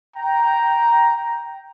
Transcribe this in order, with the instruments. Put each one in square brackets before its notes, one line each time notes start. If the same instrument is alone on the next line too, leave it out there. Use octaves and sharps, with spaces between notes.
[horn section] G5 A#5